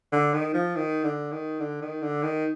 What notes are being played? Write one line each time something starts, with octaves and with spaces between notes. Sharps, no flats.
D3
D#3
F3
D#3
D3
D#3
D3
D#3
D3
D#3